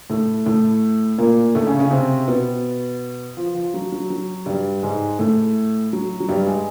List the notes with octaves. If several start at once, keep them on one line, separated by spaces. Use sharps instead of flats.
A2 A3
A2 A3
A#2 A#3
A2 A3
C#3 C#4
C#3 C#4
C3 C4
B2 B3
F3
F3
F#3
F#3
F#3
G2 G3
G#2 G#3
A2 A3
F#3
F#3
G2 G3
G#3